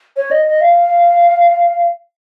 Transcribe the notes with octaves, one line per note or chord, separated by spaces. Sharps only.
C#5
D#5
D#5
F5